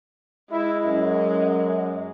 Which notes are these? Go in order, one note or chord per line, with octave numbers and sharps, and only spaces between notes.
G#3 E4
F#2